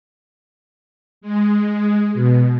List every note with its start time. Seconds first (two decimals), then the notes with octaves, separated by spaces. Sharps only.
1.21 G#3
2.14 B2